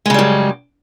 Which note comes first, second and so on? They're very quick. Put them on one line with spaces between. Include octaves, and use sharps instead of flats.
G#3 C#3 G3 F#2